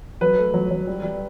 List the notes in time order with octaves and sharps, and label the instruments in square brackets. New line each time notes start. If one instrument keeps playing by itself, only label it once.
[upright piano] F#3 [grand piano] B4
[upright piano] A3
F#3
F#3
G3
G3